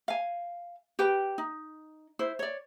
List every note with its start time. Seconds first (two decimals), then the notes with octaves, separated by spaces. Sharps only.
0.08 F5 G#5
0.99 G4 B4 G5
1.38 D#4
2.19 E4 C5
2.39 C#5 D5